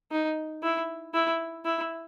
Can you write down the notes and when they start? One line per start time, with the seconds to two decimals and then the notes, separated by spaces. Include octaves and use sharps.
0.11 D#4
0.63 E4
1.14 E4
1.65 E4